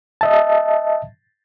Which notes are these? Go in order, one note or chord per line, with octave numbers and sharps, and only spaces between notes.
D#5 E5 A5